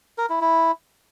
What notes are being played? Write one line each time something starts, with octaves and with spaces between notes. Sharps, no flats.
A#4
E4
E4